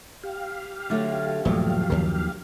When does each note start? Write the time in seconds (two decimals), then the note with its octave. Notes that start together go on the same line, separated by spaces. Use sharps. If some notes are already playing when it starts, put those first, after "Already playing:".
0.23 G4 F5
0.90 D3 F#3 A3
1.45 D#1 G2 F3 F#3 A3
1.90 D#2 D#3